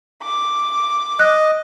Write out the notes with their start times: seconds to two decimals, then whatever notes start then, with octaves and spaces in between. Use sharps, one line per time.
0.22 D6
1.19 D#5 F#6